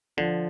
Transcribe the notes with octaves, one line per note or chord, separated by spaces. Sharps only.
D3 F3